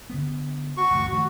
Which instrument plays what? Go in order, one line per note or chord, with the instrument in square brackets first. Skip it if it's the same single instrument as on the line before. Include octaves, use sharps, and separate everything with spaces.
[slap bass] D3 B3
[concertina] F#4 C#6
[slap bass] A1 D2 G2
[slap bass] D#3 F3 A3 [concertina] F#4